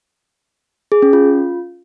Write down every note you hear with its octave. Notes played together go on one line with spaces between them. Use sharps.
G#4
C#4
F4